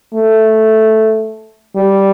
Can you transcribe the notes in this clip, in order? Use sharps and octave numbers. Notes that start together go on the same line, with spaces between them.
A3
G3